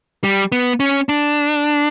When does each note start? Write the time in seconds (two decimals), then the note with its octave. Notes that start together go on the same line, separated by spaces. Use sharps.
0.24 G3
0.52 B3
0.80 C#4
1.09 D4